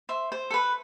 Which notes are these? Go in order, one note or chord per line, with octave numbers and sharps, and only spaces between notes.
C5 E5
C5
A4
B4